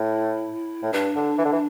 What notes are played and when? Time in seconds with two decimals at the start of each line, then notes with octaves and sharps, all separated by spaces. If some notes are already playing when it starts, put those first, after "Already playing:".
Already playing: A2 E4
0.83 A2
0.93 G2 D4
1.16 D3
1.38 E3
1.45 D3
1.52 E3